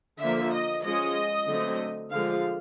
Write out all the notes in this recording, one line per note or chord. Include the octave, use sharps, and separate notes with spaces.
D3 F3 A#3 E5
D#5
F3 G#3 C#4 D#5
D3 F#3 A3 C4
D3 F3 G#3 F5